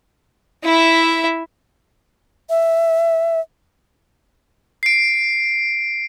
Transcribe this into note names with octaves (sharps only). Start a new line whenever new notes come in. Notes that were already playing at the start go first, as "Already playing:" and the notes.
E4 E5
E5
C7 D7